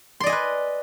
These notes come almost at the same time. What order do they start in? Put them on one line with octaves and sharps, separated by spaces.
C6 D5 D#5 G#5 B4